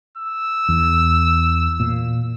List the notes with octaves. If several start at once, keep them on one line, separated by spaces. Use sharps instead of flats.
E6
E2
A#2